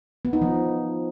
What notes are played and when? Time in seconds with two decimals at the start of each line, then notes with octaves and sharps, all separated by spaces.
0.25 B3
0.33 D#4
0.42 F3